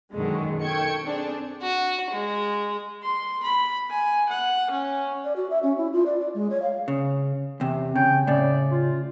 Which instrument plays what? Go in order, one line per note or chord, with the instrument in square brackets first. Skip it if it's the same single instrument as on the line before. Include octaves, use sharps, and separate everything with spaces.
[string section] F#2 B2 D3 D#3 F#3 G#3
D#3 A4 G5 C#6 G#6 C#7
C4 D4 G#4
[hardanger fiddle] F#4
G#3
[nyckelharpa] C6
B5
G#5
F#5
C#4
[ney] D5
F#4
E5
C#4
E4
F4
D5
D5
G#3
C#5
F5
[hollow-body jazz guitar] C#3
E2 C3
[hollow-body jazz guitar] C#3 [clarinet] G5
[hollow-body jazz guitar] A2 C#3 [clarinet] D5
[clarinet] F4